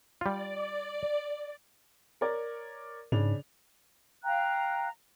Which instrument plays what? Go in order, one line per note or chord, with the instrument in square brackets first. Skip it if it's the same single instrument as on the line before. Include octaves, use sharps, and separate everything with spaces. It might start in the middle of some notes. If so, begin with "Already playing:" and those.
[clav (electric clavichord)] G3 F4 [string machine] D5
[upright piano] A#4 C#5 D5
[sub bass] G#2 [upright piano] C#3 D4 F7
[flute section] F5 G5 A#5 F#6